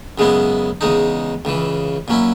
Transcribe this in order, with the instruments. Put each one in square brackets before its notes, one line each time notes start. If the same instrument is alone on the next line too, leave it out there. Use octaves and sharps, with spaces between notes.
[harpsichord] F#2 C#3 G#3 B3 E4
E2 C#3 G#3 D#4
C#2 C#3 E3
A#2 F#3 C#4 E4